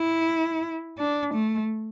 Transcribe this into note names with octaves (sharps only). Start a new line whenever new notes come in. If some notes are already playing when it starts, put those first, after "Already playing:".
Already playing: E4
D4
A3